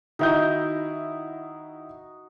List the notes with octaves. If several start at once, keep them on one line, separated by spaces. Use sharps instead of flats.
D#3 D#4 E4 F#4 D#5 G6